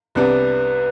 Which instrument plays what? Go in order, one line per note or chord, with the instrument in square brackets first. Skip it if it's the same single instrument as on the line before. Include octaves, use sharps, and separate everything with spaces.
[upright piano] C2 C3 G3 B3 D4 [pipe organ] B4